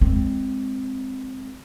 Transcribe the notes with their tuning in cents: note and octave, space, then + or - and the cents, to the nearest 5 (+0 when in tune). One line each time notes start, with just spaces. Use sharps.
G#3 +0 C4 +0